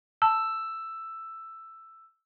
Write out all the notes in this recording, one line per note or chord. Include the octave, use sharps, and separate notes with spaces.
A5 E6